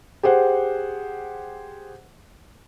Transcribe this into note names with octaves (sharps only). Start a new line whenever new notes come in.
G4 G#4 C5 F#5